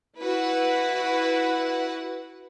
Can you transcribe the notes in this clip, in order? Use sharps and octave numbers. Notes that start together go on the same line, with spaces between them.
E4 F#4 B4 F#5